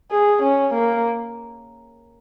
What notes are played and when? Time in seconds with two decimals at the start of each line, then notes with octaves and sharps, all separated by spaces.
0.11 G#4
0.43 C#4
0.74 A#3